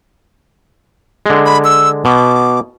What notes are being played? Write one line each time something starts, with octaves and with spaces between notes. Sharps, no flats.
D3 G#3
B5
E6
B2 D6